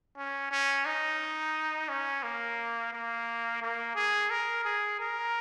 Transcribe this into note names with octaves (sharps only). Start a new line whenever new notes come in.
C#4
C#4
D#4
C#4
A#3
A#3
A#3
G#4
A#4
G#4
A#4